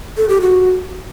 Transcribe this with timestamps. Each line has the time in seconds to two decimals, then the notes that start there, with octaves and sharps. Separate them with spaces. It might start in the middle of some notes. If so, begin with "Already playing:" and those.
0.17 A4
0.29 G4
0.41 F#4